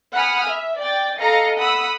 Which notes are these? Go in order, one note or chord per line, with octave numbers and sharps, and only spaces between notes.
F#5 G#5 B5 D#6 F6
E5
D5 G5 A6
A4 D#5 F5 A#5 A#6 C#7
F#5 B5 D#6 E6